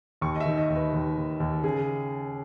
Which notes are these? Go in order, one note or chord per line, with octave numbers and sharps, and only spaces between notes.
D#2 C#6
D#5
E5
D#3
D#5
D#2
B4
D#2
D#2
D#2
C#3 G#4